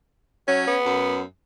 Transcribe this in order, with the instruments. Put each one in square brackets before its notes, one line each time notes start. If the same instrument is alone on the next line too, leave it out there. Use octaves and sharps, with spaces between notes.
[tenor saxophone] F#3 [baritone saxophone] C#4
[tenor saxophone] B3
[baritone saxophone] F#2